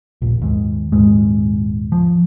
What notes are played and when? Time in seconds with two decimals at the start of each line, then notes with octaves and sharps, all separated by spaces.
0.22 D#1 A#1
0.42 D#2 G#2
0.92 D#1 D#2 G#2 G#3
1.92 F3